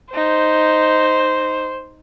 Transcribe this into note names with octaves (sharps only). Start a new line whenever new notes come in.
D#4 C5